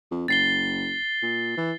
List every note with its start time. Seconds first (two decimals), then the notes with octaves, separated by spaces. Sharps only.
0.11 F2
0.28 F#1 A6 C7 G7
1.22 A#2
1.57 E3